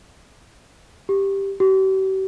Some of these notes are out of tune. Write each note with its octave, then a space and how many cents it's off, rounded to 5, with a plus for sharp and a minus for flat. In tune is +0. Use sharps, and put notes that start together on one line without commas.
G4 +5
G4 -45